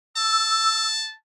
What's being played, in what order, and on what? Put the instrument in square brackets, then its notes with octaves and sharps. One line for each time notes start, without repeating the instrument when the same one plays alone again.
[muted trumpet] A5 [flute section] E6